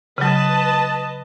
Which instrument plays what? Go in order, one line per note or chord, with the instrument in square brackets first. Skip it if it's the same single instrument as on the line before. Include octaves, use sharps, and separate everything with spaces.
[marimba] C#3 F#3 [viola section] B4 D#5 A5